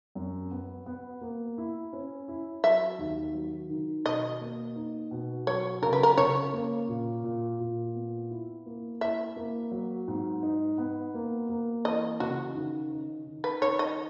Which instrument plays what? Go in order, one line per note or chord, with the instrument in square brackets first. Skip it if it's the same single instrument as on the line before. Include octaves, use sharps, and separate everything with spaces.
[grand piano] F#2
B3
B3
A#3
E4
C#4
E4
[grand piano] F#3 [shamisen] E5
[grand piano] D#2
F#3
D#3
[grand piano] B2 [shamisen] D#5
[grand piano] A#3
D#4
B2
[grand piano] F#3 [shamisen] C#5
[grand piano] C#3 [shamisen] A#4
[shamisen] B4
A#4
[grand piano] C#3 [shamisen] C#5
[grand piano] A#3
A#2
A#2
A#2
B3
E4
A#3
[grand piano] E4 [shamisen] E5
[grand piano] A#3
F#3
G#2
D#4
B3
A#3
A#3
[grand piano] E3 [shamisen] D#5
[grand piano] C#3 [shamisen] F#4
[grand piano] D#3
D#4
D#3
[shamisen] B4
[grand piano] D#3 [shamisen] C#5
[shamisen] D#5